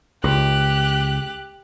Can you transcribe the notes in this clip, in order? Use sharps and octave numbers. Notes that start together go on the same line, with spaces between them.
C#2 G4 F#6